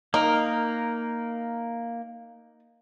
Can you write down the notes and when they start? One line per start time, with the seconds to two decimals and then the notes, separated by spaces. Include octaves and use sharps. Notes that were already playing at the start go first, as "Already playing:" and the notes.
0.14 A#3 D#4 A#4